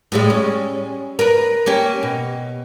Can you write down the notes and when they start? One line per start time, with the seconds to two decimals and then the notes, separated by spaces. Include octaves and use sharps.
0.12 A2 G3 G#3
0.30 C#4
1.19 A#4 B4
1.66 A#3 C#4 G4
2.03 B2